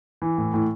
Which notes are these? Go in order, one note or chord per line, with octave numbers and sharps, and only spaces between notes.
E3
A2
A2